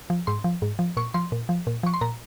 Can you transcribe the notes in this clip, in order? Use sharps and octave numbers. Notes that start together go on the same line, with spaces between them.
F3
G#2 C6
F3
G#2
F3
A#2 C#6
F3 C6
A#2
F3
A#2
F3 C#6
C6
A#2 A#5